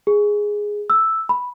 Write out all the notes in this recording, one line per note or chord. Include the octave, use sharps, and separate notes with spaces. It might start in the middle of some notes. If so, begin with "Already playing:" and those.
G#4
E6
B5